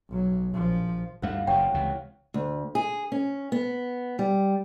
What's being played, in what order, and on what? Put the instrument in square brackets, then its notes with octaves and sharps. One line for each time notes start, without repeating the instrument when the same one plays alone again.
[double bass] B1 F#3
A#1 F3
[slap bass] D2 G2 A3 [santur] F5 F#5
[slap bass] F#1 F#2 A#2 [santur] C#5 [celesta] G5
[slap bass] C#2 C3 E3
[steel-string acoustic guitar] D2
G#4
C#4
B3
G3